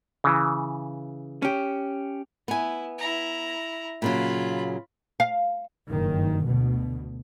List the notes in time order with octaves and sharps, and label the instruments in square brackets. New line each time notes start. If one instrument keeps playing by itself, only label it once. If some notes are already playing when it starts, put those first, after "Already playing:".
[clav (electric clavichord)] C#3 E3
[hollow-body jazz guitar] C#4 G4
[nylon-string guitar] B3 G#5 [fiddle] E4
[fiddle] E4 A#5
[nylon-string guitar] A#2 C#3 F#3 [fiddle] F4 B5
[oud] F5
[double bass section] F#1 G2 D#3
D2 B2